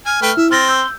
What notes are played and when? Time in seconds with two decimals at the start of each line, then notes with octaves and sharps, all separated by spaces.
0.06 G#5 F6
0.22 A3 B4 G5
0.37 E4 E5
0.51 C4 C6 F6 A6 A#6
0.68 E6 G6